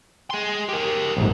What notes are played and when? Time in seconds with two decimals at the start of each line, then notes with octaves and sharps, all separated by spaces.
0.30 G#4 C6
0.69 G4 A#4
1.17 A#1 G#2